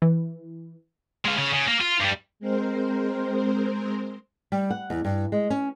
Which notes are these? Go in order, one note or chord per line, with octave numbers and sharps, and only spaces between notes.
E3
G#3 F5
C#3
C#3
A#3
F4
G2 G3
G#3 C4 A#4 C5
G3
F#5
E2
G2
G#3
C#4